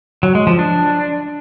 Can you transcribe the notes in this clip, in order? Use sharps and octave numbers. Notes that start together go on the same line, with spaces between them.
F#3
G#3
F3
D4